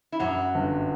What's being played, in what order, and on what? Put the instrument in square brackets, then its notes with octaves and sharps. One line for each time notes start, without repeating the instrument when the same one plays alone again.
[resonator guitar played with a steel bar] E4
[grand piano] F#2 [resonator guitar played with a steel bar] F#3 F#4
[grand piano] G1